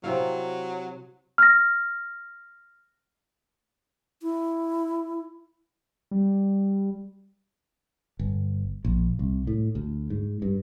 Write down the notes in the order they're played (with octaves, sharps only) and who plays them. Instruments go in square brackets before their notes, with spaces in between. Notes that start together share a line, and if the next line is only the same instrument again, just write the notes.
[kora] C3 E4 F5 [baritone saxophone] F#3
[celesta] F6 A#6
[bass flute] E4
[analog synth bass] G3
[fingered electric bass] G1
A#1
C2
A2
D2
G#2
G2